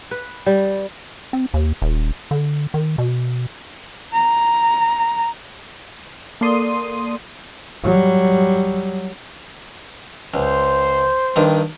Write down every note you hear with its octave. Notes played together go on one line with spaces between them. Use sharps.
B4
G3
C4
D#2
D#1
D3
D#3
B2
A#5
A#3 A4 D5 C6 D#6 D#7
F#3 G3
C#2 C5
G2 D#3